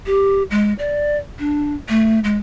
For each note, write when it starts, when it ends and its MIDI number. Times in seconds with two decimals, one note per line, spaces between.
0.06 0.43 67
0.51 0.73 56
0.79 1.17 74
1.39 1.75 62
1.89 2.19 57
2.24 2.38 56